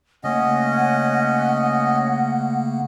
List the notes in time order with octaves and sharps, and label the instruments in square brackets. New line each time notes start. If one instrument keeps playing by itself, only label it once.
[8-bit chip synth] C#3 A3 A#3 [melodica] C#4 D#5 [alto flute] F#5